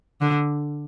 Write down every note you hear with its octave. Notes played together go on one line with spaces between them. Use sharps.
D3